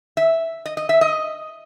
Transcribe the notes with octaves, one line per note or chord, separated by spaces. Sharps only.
E5
D#5
D#5
E5
D#5